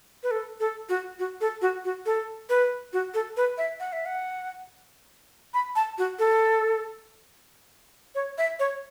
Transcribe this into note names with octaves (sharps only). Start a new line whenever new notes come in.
B4
A4
A4
F#4
F#4
A4
F#4
F#4
A4
B4
F#4
A4
B4
E5
F#5
E5
F#5
B5
A5
F#4
A4
C#5
E5
C#5